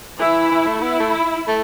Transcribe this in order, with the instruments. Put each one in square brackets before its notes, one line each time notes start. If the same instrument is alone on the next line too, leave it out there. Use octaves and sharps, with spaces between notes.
[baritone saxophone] E3 [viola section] E4
[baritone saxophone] E3
A3
[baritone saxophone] B3 [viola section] E4
[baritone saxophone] A3
A3